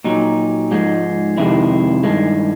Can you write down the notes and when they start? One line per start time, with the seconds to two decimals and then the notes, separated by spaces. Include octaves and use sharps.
0.04 A#2 F#3 D#4
0.71 G#2 F3 G#3
1.37 F2 C3 D#3 G#3 E4
2.03 G2 D#3 G#3